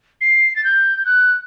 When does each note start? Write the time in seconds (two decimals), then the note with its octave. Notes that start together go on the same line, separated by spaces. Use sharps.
0.21 C7
0.56 A6
0.64 G6
1.05 F#6